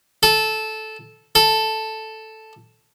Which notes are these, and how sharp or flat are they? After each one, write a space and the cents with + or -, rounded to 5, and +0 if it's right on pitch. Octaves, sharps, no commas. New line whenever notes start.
A4 -10
A4 +0